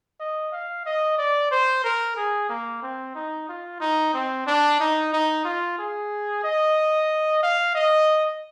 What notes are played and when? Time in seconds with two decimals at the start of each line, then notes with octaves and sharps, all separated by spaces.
0.20 D#5
0.52 F5
0.86 D#5
1.18 D5
1.51 C5
1.84 A#4
2.16 G#4
2.49 A#3
2.82 C4
3.15 D#4
3.49 F4
3.81 D#4
4.14 C4
4.47 D4
4.80 D#4
5.13 D#4
5.45 F4
5.79 G#4
6.44 D#5
7.43 F5
7.75 D#5